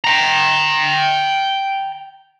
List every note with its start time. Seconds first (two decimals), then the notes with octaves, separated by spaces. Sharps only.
0.04 G5 A#5